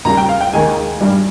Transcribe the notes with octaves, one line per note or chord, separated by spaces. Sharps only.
D#2 C#3 G3 A#5
G5
F5
G5
D#2 D#3 G#3 G#5
G2 G3